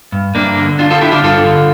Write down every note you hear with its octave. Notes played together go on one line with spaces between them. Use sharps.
G2
G2 A#3 D4
D3
D3 D4 F4
F4 A4
D3 E4 G4
D4 F4
G2 F4 A4
D3